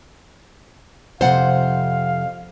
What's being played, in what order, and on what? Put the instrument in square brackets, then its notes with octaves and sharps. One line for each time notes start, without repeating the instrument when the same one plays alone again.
[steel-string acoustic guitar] F2 C3 [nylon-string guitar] C5 F#5 [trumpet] F5